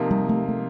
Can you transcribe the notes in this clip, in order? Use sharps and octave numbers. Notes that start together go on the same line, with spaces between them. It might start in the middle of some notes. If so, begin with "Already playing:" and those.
Already playing: C3 F3 A#3 D#4
G3
A3
A3